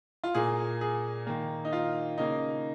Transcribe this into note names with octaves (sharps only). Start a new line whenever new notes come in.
F4
A#2 A#3 G#4
G#4
D#3 A#3
D#4
F4
C#3 A#3 D#4